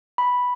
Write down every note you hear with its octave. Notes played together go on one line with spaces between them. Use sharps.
B5